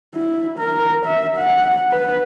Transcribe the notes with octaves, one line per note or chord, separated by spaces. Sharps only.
E4
A#4
E5
F#5
B4